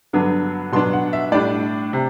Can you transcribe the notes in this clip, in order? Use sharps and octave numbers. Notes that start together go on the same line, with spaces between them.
G2 D3 F#3 B3 D4
B2 F#3 B3 D4 C6
F#5
E5
A2 G3 D4 D5
C3